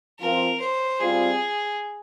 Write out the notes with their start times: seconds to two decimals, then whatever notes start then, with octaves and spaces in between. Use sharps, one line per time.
0.19 F3 C4 F4 A#4
0.60 C5
1.00 G3 C4 F4 G#4